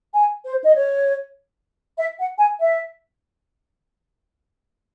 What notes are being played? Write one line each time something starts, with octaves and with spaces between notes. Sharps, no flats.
G#5
C5
D#5
C#5
E5
F#5
G#5
E5